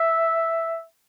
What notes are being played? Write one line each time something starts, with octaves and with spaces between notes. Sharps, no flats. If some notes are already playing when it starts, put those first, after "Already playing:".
Already playing: E5